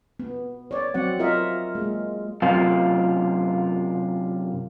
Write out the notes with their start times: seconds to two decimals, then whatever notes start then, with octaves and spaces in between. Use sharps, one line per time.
0.19 B3
0.71 C#5 D5
0.94 F#3 C4 F#5
1.19 F4 A#4 D#5 E5
1.75 G#3 A#3
2.42 F#2 C3 F4